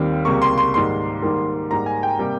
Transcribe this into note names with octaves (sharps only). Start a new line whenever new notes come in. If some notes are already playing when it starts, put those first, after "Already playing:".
Already playing: D#2 D#3 G3 C4
C#2 C3 G3 A#3 C#6
C6
C6
G#2 D#3 G3 A#3 C6
G#2 D#3 G3 A#3
G#2 G3 A#3 A#5
G#5
G5
C3 G3 A#3